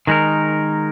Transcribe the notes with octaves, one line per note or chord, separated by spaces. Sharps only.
D#3 G#3 D#4 A#4